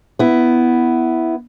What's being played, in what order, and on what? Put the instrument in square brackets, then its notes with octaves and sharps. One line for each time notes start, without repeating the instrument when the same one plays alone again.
[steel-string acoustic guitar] B3 E4